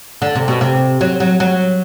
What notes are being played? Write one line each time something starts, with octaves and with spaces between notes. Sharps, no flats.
D3
C3
B2
C3
F#3
F#3
F#3